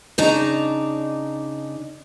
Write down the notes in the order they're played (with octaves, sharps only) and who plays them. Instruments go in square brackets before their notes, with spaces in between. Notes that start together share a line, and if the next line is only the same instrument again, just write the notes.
[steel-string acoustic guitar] C#3 D4 D#4 D5 A#5